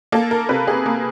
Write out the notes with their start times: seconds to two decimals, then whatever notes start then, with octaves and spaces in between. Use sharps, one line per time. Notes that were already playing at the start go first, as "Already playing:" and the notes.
0.12 A#3 A4
0.31 A#4
0.49 C3 B4
0.67 G#4
0.86 A#3